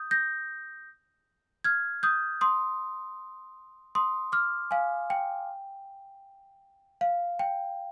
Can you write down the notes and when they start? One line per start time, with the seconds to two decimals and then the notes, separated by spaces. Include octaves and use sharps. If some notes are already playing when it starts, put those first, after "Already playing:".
Already playing: D#6 G6
0.11 G6 A#6
1.64 F6 G#6
2.03 D#6 G6
2.41 C6 D#6
3.95 C6 D#6
4.32 D6 F6
4.71 F5 G#5
5.10 G5
7.01 F5
7.39 G5